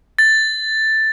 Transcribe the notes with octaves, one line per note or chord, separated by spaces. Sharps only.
A6